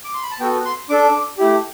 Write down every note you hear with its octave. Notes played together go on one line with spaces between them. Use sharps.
D6
C6
B5
A5
B3 F#4 A4 G5
C6
D4 A4 D6
A3 E4 G4